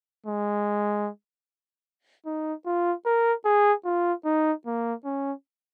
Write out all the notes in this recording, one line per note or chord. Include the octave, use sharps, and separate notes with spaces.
G#3
D#4
F4
A#4
G#4
F4
D#4
A#3
C#4